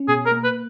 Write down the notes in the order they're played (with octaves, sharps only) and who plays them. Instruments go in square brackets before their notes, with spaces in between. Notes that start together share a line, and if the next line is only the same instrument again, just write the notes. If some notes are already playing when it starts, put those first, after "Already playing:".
Already playing: [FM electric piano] C#4
[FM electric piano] B2 [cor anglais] G#4
[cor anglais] A#4
[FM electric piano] A#3
[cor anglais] B4